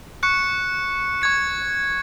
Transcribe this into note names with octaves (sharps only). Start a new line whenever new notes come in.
C#6 F#6 C#7
C#6 G#6 C#7